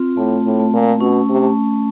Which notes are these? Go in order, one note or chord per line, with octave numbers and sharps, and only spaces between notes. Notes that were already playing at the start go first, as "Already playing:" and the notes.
Already playing: C4 F4
A2 A3
A2
A3
A#2
B2 C#4
C3
A3